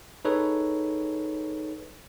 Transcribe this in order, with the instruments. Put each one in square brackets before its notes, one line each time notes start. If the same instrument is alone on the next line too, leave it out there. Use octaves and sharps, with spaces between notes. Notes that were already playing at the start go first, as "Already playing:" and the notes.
[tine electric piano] D#4 G#4 A4 B4 C#5